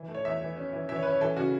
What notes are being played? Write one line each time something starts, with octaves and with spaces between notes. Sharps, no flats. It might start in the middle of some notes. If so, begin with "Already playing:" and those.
Already playing: E3
A3
C#5
E2 E5
E3
C#4
E3
E3 E5
C#5
C#4 B4
C#5
E3 A4
C#3 F#4